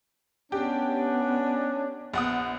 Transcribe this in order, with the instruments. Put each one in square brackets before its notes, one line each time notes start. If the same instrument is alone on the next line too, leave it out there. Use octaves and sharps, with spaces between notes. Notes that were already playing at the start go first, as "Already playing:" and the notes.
[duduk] B3 [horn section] C#4 D4 [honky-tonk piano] G4
[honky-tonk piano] A#1 F#5 D#6 [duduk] B3